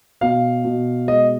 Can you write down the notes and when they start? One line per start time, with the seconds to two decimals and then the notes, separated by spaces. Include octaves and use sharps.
0.21 B2 F5
0.64 B2
1.08 G#3 D#5